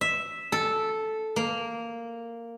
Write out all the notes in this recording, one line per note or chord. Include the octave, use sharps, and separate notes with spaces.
E5
A4
A#3